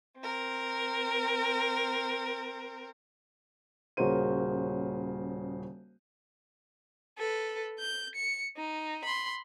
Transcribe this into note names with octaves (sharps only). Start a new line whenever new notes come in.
C4 A#4
D#1 C#3 F#4 A#4 C5 D#7
A4 B4
G6
C#7
D#4
B5 C6